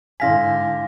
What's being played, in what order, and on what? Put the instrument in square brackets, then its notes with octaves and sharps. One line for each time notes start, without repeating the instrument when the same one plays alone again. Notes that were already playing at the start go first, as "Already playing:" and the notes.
[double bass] G#2 D3 [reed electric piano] E4 F5 G#5 [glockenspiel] C6 A#6 B6